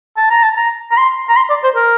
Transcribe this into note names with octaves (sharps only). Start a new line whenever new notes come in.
A5
A#5
A5
A#5
A#5
C6
A#5
C6
D5
C5
A#4